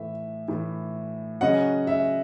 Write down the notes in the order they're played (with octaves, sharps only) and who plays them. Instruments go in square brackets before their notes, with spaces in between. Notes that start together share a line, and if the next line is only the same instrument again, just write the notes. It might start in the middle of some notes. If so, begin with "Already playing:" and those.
Already playing: [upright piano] A2 E3 A3 E5
A2 E3 A3
C#3 F#3 C#4 D#5 F#5
E5